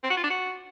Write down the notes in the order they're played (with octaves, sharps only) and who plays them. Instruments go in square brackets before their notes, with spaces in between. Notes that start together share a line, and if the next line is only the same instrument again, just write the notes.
[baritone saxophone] C4
F#4
F4
D4
F#4